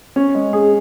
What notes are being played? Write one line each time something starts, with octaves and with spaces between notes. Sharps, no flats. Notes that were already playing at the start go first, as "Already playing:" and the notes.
C#4
G#3
G#4